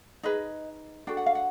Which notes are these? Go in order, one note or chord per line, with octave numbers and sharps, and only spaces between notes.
D#4 G#4 B4 D#5
D4 F#4 A4 G5
F#5
F5
F#5